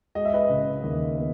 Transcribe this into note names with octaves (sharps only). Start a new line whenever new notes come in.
G#3 D#5
E5
B4 D#5
C#3
D#2
B3